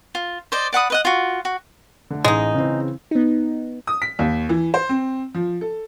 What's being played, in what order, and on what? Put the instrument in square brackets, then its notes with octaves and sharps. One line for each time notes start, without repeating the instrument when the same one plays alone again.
[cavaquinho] F4
C5 D5 D#5
D5 F#5 B5 D#6
B4 D#5 F#5
F4 F#4
F#4
[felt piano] D3 A3
[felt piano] A1 [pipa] G#3 D#4
[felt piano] C#3 E3 C4
[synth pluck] B3 D#4
[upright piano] D#6
B6
D#2
E3
C5
C4
F3
A4